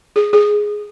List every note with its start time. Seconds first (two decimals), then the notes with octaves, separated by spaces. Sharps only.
0.16 G#4
0.33 G#4